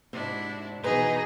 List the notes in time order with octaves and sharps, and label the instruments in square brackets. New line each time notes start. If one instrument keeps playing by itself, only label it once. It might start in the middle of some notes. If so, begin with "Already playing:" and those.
[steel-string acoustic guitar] G#2 C3 [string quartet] D4 E4 F#4
[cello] B2 D#4 [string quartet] E3 F#4 G#5 [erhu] G#4 [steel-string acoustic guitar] B4 A#5